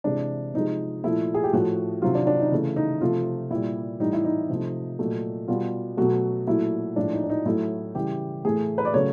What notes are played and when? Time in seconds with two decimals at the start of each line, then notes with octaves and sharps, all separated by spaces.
0.04 C3 E3 G#3 D4
0.54 C3 F3 G#3 D#4
1.04 A#2 F3 A3 E4
1.34 G#4
1.44 G4
1.53 A2 F3 A3 F#4
2.02 C3 D#3 F#3 F4
2.15 D4
2.27 D4
2.40 D#4
2.52 C#3 E3 A3
2.76 D#4
3.01 C3 F3 A3 F4
3.50 A#2 G3 E4
4.00 A2 E3 G3 D#4
4.13 E4
4.24 D#4
4.49 C3 F3 A3
4.99 A#2 F#3 A3
5.48 B2 G3 F4
5.97 B2 F#3 A3 F#4
6.47 A#2 F#3 A3 E4
6.96 A2 F3 G#3 D4
7.13 D#4
7.24 D4
7.30 D#4
7.45 A2 F#3 A3 E4
7.95 C#3 E3 G3 G4
8.45 A2 E3 A3 G#4
8.78 B4
8.85 D5
8.94 C#3 F#3 A3 C#5